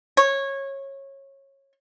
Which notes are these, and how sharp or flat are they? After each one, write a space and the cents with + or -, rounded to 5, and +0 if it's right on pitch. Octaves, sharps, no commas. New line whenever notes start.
C#5 -20